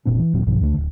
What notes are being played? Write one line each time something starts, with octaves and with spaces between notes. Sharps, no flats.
F1 A#2 C4 D4
E3
D#1 A#2 F#3 C4
A#1 G2 B2 F3
D2 D3 G#3 A3
D1